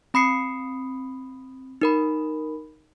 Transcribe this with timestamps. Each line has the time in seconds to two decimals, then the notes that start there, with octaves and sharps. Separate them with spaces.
0.14 C4 B5 D#6 C7 C#7
1.81 D#4 A#4 B5